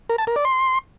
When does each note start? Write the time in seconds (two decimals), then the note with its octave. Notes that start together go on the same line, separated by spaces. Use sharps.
0.10 A#4
0.18 A5
0.27 A#4
0.36 D5
0.45 C6